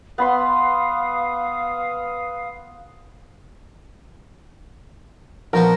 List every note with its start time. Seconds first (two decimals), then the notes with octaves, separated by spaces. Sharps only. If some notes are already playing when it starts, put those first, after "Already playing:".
0.18 B3 F5 B5 C6 D#6
5.53 A#1 F3 B3 A#4